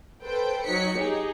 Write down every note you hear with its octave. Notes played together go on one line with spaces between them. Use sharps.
A4 B4 C5 G5
F#3 D#4 B6 C#7
D#4 G4 G#4